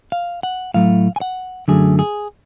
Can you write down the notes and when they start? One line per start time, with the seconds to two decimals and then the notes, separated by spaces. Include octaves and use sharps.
0.12 F5
0.43 F#5
0.74 A2 F#3 A3 F5
1.16 G#5
1.21 F#5
1.68 F#2 D3 F#3 A3 G#4
1.99 G#4